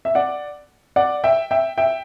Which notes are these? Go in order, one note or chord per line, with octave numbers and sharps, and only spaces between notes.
E5
D5 F#5
D5 F#5
E5 G5
E5 G5
E5 G5